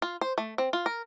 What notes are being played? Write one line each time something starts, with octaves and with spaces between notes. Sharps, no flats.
F4
C5
A3
C4
F4
A#4